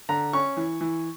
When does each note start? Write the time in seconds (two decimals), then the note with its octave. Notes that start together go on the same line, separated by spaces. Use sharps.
0.09 D3 A#5
0.33 C#4 C#6
0.57 E3
0.81 E3